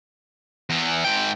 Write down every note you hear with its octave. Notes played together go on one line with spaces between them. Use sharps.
E2 E3
G#2 G5